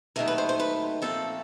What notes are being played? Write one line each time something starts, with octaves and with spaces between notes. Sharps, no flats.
D#2 D#3 F#3 A3 A#4
B4
C5
C5
B4
A#2 F3 A3 C4 A4